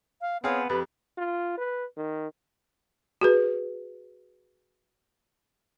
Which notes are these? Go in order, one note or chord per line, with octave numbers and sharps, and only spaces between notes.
F5
B3 C4 G#4 C#5 F5
F2 G4 B4
F4
B4
D#3
F#4 G#4 B4